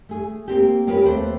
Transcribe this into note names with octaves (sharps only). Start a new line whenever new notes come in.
A3 G#4
A#3 C4 G4
C#4 F4 G4 A#4 B4
D#2 A3 C4 A4 B4 C5